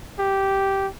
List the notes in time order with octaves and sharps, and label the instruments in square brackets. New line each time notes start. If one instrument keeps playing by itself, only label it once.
[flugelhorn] G4